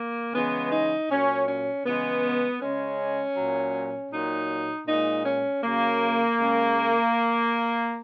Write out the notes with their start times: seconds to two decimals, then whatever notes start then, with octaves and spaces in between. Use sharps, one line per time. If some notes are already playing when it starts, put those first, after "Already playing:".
Already playing: A#3
0.34 C#3 E3 G#3 B3
0.72 D#4
1.10 A#2 F#3 C#4
1.48 C#4
1.86 C#3 E3 G#3 B3
2.61 C#3 G#3 C#4
3.37 A#2 F#3
4.12 A#2 F#3 D#4
4.87 A#2 G#3 D#4
5.25 C#4
5.64 C#3 F#3 A#3
6.39 C#3 G#3